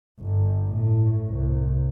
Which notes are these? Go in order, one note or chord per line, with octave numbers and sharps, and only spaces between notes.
G1
A2
C2